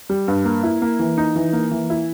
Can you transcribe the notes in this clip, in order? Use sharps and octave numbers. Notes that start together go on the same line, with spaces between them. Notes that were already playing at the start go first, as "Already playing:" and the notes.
G3
G2
A#3
E4
A#3
E3
D#4
E3
A#3
E3
E4